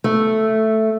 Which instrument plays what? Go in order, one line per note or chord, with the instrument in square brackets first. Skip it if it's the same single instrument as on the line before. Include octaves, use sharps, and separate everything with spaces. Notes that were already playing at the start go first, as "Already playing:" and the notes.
[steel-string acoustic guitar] A3